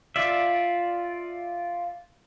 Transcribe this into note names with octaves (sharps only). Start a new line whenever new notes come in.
F4 D5 E5